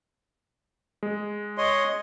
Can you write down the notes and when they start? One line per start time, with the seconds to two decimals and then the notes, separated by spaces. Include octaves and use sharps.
1.03 G#3
1.58 C#5 D#5 C6